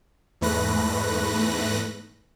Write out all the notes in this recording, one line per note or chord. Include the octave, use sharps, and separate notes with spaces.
E2 G#2 A3 B4 F#6 A#6